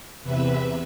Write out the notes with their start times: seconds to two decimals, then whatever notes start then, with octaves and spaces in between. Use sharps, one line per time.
0.23 E2 C3 B4 E5